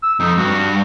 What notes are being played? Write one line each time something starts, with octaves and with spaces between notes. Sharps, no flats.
E6
F2 D#4
G2 F#4